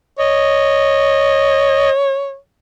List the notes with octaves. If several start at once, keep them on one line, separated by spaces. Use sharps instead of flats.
C#5 D#5